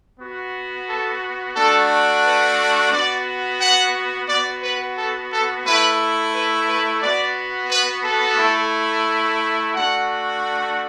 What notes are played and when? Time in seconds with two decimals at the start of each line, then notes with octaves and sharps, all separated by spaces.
0.20 B3 F#4
0.88 A4
1.56 A3 D4 F#4 A4
2.24 B4
2.92 B3 F#4 D5
3.60 F#5
4.29 B3 F#4 D5
4.63 B4
4.97 A4
5.31 A4
5.65 A3 E4 B4
6.34 B4
6.67 B4
7.01 B3 F#4 D5
7.70 B4
8.04 A4
8.38 A3 E4
9.75 A3 D4 F#4 F#5